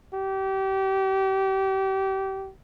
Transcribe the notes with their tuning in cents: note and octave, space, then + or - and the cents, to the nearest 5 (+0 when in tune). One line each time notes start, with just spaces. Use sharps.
G4 -30